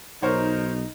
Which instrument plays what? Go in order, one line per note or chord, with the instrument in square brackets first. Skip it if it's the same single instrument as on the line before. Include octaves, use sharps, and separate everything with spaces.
[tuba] B1 [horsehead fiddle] D#4 [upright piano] A#4 C5 C#5